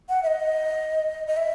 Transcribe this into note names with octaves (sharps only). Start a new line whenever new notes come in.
F#5
E5
D#5
D#5
E5